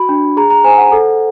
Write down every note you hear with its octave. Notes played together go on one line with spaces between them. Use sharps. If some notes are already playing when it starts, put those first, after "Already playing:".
Already playing: F#4 B5
D4
G#4 A#5
A#5
C5 G#5
F#5
A4